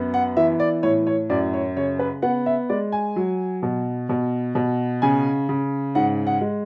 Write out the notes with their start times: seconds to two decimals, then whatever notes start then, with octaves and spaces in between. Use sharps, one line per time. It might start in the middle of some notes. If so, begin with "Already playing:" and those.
Already playing: F#2 B3
0.14 F#5
0.37 E3 E5
0.60 D5
0.83 A2 C#5
1.07 C#5
1.30 F#2 D5
1.54 C#5
1.77 C#3 C#5
1.99 B4
2.22 B3 F#5
2.46 E5
2.69 G#3 D5
2.92 G#5
3.16 F#3
3.63 B2
4.09 B2
4.55 B2
5.02 C#3 G#5
5.49 C#3
5.95 G#2 F#5
6.27 F#5
6.41 G#3